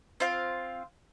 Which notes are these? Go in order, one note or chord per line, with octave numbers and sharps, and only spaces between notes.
C4 F4 F5